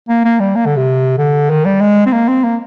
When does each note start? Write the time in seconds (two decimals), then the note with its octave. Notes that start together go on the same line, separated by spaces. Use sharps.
0.09 A#3
0.24 A#3
0.40 G3
0.56 A#3
0.66 D3
0.76 C3
1.18 D3
1.50 D#3
1.65 G3
1.81 G#3
2.06 C4
2.13 A#3
2.28 C4
2.44 A#3